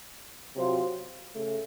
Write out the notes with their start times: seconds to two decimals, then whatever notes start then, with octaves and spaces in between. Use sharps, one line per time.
0.56 C3 F#3 C4 F4 C5
1.34 C#3 A3